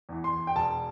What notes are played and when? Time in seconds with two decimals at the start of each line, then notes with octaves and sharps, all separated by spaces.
0.09 E2 E3
0.24 C6
0.47 G5
0.56 E1 A5